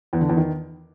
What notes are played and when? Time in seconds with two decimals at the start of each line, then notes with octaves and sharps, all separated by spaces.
0.13 E2
0.21 D3
0.29 E2
0.37 D#3